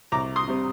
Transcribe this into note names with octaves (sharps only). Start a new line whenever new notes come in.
C2 A#5 D6
C6 D#6
C3 G3 C4